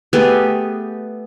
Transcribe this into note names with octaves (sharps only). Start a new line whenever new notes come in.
A3 B3 G4 G#4